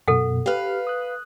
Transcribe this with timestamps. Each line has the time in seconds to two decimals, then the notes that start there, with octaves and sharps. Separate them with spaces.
0.08 F#2 B2 A4 F#5
0.46 G4 B4 F5 F6
0.87 D#6 F#6